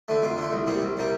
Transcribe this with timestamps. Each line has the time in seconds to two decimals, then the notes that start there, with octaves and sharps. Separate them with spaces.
0.08 D3 A3
0.22 F2 F4
0.37 D3 A3
0.53 C2
0.67 C3 G3 A#3
0.82 C2
0.97 C3 G3 A#3